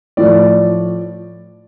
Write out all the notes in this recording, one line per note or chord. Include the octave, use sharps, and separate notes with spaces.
A2 F3 D5